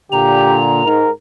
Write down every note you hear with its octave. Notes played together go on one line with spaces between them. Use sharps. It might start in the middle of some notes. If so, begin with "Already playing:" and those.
A#2 D3 G4 A#5
G#2 A#4